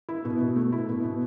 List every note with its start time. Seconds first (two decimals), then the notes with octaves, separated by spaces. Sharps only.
0.09 E4
0.25 B2
0.41 B2
0.56 A3
0.72 E4
0.89 B2
1.04 B2